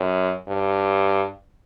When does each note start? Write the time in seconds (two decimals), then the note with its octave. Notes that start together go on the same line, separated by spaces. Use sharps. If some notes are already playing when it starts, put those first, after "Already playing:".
Already playing: F#2
0.48 G2